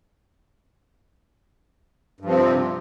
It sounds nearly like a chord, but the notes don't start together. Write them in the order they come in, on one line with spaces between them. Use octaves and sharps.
G2 F3 C4 C3